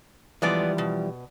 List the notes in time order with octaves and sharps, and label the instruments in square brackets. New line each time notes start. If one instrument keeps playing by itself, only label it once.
[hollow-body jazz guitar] E3 F3 G3 [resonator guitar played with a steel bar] G#3 B3 D5
[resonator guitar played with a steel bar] B2